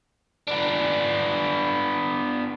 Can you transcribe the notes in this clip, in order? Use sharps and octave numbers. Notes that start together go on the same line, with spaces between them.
B3 D4